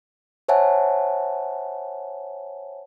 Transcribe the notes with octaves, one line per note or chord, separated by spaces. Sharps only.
C5 C#5 E5 F#5 G#5 A5